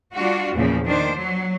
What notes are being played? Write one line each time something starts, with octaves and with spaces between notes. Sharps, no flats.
G3 D4 F4 F#4
E2 A#2 C#3 F3
D#3 D4 C5
F#3